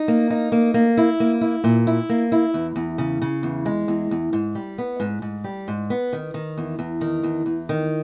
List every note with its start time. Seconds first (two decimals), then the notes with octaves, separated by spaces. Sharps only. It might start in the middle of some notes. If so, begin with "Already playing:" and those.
Already playing: D#4
0.08 A#3
0.30 D#4
0.52 A#3
0.74 A#3
0.97 E4
1.20 A#3
1.41 E4
1.64 A#2
1.87 E4
2.09 A#3
2.32 E4
2.54 E2
2.76 E2
2.98 C#3
3.22 C#3
3.43 E2
3.66 G#3
3.88 E2
4.11 E2
4.33 G#2
4.55 G3
4.78 B3
5.00 G#2
5.22 G#2
5.44 G3
5.68 G#2
5.90 B3
6.13 D#3
6.34 D#3
6.57 E2
6.79 E2
7.01 D#3
7.23 E2
7.46 E2
7.69 D#3